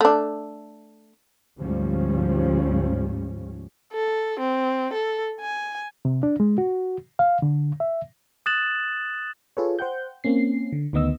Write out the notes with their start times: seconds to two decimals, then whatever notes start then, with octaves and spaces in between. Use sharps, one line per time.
0.01 A3 D4
1.58 D2 G#2 F3 G3 C#4
3.93 A4
4.40 C4
4.93 A4
5.40 G#5
6.05 C3
6.23 D4
6.40 G#3
6.58 F#4
7.19 F5
7.42 D3
7.80 E5
8.46 D#6 F#6 A6 E7 F#7
9.57 F4 G#4 A4 B4 C#5
9.79 C5 F#5 G5 G6
10.24 A#3 C4 C#4 C7
10.72 D3
10.93 D2 D#3 B3 D#5 E6